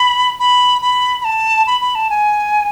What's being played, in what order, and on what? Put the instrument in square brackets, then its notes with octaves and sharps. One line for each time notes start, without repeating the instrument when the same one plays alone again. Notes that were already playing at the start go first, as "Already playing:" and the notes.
Already playing: [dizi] B5
B5
B5
B5
A5
B5
B5
A5
G#5